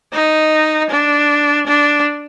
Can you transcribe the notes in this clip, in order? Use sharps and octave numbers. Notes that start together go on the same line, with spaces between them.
D#4
D4
D4